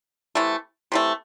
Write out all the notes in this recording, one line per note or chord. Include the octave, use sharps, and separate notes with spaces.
C3 E3 A3
C3 E3 A3